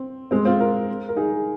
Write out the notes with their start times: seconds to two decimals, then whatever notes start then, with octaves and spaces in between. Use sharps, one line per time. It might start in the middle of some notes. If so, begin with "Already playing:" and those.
Already playing: C4
0.31 G#3 C4
0.45 C4 F4
0.59 F4 A#4
1.09 A#4
1.16 D#4 G#4